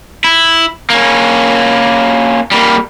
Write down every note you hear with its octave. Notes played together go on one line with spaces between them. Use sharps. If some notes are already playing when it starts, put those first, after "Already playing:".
E4
A#3 C#4
G3 A#3